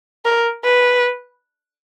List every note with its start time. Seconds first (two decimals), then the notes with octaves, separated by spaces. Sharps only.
0.25 A#4
0.64 B4